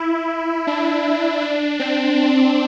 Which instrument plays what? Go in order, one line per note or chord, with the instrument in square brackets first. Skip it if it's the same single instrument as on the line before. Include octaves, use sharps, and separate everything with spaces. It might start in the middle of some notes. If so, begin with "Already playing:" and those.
Already playing: [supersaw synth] E4
D4
D4
C4
D4